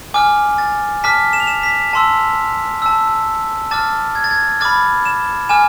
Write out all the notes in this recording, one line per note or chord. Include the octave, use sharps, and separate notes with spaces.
G#5 D6 F6
A6
A5 D6 F6 B6
E7
F7
E7
B6
A5 C6 E6
A5 E6
A5 D6 F6 A6
G#6
A6
G#6
B5 D6 F6 A6
E7
G#5 D6 F6 E7